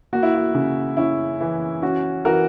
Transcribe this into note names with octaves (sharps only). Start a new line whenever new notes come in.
A#3 F#4
E4
F#4
C#3
C#4 E4
E3
C#4 F#4
E3 F#4 A#4